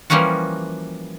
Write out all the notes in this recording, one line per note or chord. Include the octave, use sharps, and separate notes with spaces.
E3 F3 G3 A#3 C#4 F#4